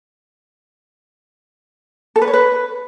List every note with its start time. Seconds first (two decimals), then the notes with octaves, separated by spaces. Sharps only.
2.16 A4
2.22 B4
2.27 C#5
2.33 B4